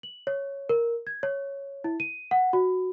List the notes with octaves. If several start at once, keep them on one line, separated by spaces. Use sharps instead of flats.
F#7
C#5
A#4
G#6
C#5
E4
D#7
F#5
F#4